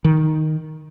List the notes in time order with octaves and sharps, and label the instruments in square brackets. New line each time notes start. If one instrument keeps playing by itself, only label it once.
[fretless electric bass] D#3